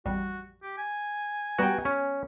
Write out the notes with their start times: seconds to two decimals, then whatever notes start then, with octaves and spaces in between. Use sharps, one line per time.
0.06 A1 F2 G3 F#4
0.63 G4
0.78 G#5
1.59 G3 B3 F#4 G5 A#5
1.85 C#4